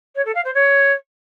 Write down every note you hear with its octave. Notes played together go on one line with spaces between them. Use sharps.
C#5
A4
F5
C5
C#5